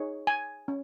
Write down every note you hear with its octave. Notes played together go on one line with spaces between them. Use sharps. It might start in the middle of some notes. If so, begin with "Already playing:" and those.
Already playing: D#4 G#4 C#5
G#5
C#4